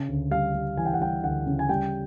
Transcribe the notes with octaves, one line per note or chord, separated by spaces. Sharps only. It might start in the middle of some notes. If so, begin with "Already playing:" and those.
Already playing: C#3
D2
G3 F5
G3
E3 G#5
G5
F#5
G3 G5
D2 F#5
C#3
G#5
G3 G5